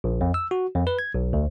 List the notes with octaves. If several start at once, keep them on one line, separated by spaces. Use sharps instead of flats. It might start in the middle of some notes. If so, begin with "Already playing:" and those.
A#1
F2
E6
F#4
F2
B4
G#6
B1
D2